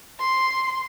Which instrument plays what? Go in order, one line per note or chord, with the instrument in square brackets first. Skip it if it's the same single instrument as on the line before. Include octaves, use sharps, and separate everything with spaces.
[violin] C6